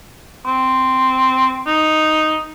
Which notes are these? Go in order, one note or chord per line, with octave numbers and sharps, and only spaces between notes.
C4
D#4